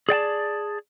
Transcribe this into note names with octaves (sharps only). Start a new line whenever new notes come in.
G#4 D5 G5 A5